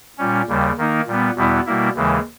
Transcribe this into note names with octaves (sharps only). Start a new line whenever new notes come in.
A#2 G3 C#4
D#2 C#3 G3
D#3 A#3 D#4
A#2 G3 B3
E2 B2 G3 B3 E4
B2 G3 A#3 E4
D#2 C#3 E3 G#3